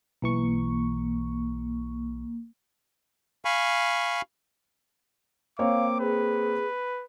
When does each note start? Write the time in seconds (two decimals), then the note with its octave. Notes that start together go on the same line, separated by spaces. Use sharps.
0.22 B1 E3 A#3 C#6
3.45 F5 G#5 B5 C#6
5.59 A#3 C4 C#5 F5 D6
6.00 G#4 B4